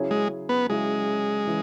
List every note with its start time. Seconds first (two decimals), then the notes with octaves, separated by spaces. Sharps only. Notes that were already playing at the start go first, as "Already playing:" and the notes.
Already playing: C#3 F#3 C#4 E4 G#4
0.11 G#3
0.49 B3
0.69 C#3 F#3 G#3 C#4 E4 G#4
1.47 C#3 E3